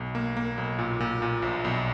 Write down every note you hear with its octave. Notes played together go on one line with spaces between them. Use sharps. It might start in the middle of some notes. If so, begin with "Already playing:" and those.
Already playing: B1
A#3
A#3
B1
A#2
A#2
A#2
A#1
B1